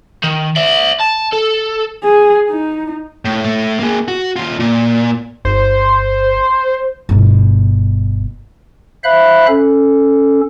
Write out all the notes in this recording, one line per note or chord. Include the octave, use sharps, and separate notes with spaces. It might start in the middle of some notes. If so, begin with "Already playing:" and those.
D#3
D5 E5
A5
A4
G#4
D#4
A2
A2 A3
A#3 G#4
F#4
D#2 F4
A#2
G1 C5
G1 B2
C5 E5 F5 B5 F#6
C#4 A4